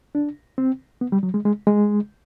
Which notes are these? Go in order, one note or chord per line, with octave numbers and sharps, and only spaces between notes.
D4
C4
B3
G3
F#3
G#3
G#3
G#3